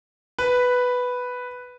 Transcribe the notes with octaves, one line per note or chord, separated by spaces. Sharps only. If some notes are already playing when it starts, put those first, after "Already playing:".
B4